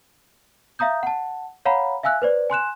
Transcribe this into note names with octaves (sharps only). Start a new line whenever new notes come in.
E5 F5 A#5 D#6 G6
F#5 A5
C#5 F5 F#5 A#5 B5
E5 F5 G#5 E6 F#6
B4 C5 D5
G#5 C6 F#6 E7